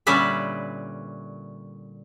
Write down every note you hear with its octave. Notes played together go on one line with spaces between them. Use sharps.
A#2 D3 G3 C#4 B4 E5